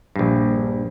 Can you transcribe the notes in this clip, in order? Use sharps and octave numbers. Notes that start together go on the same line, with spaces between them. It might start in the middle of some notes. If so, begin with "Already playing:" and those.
A#1 G2